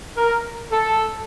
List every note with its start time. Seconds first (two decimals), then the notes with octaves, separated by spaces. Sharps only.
0.17 A#4
0.71 A4